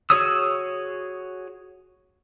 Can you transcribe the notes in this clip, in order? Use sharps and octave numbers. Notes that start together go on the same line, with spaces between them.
F#4 G#4 C#5 D#6 E6